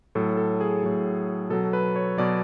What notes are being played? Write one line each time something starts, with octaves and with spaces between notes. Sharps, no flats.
A2 F#3 A4
A4
G#4
A2 F#3
B2 F#3 A4
B4
C#5
B2 F#3 D5